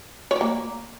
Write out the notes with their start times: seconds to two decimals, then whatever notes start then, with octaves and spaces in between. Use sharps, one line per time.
0.31 C#5
0.36 D5
0.41 A#3